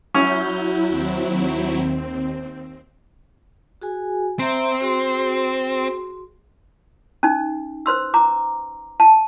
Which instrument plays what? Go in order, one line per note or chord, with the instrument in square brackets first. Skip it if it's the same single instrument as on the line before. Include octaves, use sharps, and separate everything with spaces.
[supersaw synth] F#3 E4 [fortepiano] C#4 [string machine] G6
[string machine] D#2 C4
[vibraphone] F#4 G#4 G#5
[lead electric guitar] C4 [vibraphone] E5 A#5 C6
[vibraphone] F#4 G#4 C6
[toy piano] C#4 D#4
B4 C5 C6 E6
A#5 D6
A5